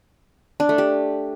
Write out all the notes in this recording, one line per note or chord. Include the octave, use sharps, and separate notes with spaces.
D4
A3
G4